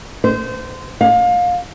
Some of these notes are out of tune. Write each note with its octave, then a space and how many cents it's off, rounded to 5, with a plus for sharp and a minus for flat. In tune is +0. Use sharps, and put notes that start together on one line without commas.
C5 -25
F5 +30